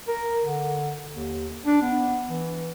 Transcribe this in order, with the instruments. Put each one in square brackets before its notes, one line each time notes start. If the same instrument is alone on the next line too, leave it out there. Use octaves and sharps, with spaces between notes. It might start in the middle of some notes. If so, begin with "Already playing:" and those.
[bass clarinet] A#4
D3
D#2
D4
B3
E3